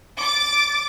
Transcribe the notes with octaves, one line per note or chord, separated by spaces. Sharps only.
D6 A6